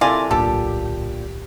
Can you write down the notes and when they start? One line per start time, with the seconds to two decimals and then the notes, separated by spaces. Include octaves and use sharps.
0.01 C3 E4 F4 A4 A#4 D5 G#5
0.31 D1 B1 A#2 D4 G4 A4 A5